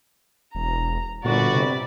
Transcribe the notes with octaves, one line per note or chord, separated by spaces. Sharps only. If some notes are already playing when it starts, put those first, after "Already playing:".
E1 A#5
G1 A#2 F#4 D5 B5
C3